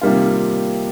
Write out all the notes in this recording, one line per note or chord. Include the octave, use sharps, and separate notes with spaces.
C3 D#3 G3 A#3 F4